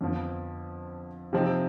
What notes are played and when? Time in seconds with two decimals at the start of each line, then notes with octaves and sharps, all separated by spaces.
0.01 F2 D3 F3 B3
1.33 C3 F3 C4 D#4